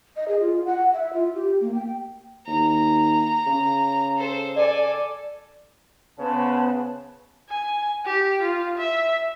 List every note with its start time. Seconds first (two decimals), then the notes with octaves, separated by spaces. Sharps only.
0.16 D#5
0.28 G#4
0.40 F4
0.65 F#5
0.93 E5
1.13 F4
1.34 G4
1.61 A#3
1.75 G5
2.47 D#2 A#5
3.47 C#3
4.17 A4 C5
4.57 A4 D5 G#5
6.18 C#3 B3 C#4 B4 C5 A5
7.49 G#5
8.06 G4
8.42 F4
8.78 E5